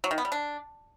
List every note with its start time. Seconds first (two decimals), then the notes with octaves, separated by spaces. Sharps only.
0.04 F#3
0.11 D#3
0.18 B3
0.25 G3
0.32 D4